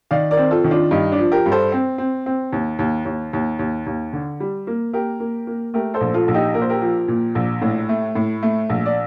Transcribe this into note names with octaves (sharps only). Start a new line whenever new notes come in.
D#3 D5 F5
A#4 D5
C4
F4 A4
D#3
D4 F4
G2 D#4
D4
F3
G4 A#4
G2
A4 C5
C4
C4
C4
D#2
D#2
D#2
D#2
D#2
D#2
D3
G3
A#3
A#3 G4 A#4
A#3
A#3
A3 G4 A#4
A4 C5
A#1
F4 A4
A#1
D#4 G4
A#2 A#4
C5
G4 A#4
F3
A#2
A#1
A2
A3
A2
A3
A#1
D5